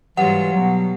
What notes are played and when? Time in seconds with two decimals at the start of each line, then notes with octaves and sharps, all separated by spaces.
0.17 G#2 E3 F#3 G3 F4 F#5
0.53 B2 F#3